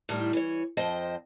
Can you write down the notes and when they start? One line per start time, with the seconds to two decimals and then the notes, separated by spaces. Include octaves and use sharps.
0.09 A2 D#3 G3
0.33 E3 C#5
0.77 F2 F3 C5 D#5 G5